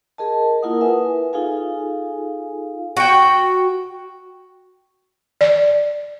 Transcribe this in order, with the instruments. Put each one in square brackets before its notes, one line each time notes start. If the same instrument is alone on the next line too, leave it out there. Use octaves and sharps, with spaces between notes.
[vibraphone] G#4 A#4 D#5 A5
A#3 E4 F4 A#4 F#5 D#6
B4 E5 G#5
D#4 F4 G#4 A4 F5 G#5
[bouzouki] F#4 G5
[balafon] D5